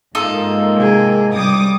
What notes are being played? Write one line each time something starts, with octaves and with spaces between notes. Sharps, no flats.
G#2 A#3 D#4 F4 A4
C3 G#4
C3 G3 D6 D#6